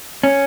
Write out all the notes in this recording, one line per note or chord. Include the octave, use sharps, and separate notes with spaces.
C#4